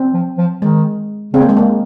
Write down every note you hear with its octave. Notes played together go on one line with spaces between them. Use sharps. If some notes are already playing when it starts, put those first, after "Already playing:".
Already playing: C4
F3
F3
D#3 G#3
C#3 C4
A#3
G#3
A#3